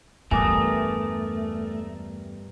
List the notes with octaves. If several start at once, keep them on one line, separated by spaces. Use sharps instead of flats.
E2 G2 A3 A#4 G#5 D6 D#6